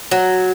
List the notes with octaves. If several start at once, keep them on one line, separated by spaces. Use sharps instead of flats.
F#3